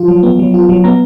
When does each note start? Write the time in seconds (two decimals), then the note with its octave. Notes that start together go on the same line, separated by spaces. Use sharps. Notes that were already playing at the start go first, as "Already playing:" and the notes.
Already playing: F3 F4
0.08 F#3
0.23 B3
0.39 F#3
0.54 F4
0.69 F#3
0.84 B3 A#5